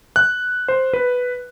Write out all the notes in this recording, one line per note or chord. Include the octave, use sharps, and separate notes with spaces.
F#6
C5
B4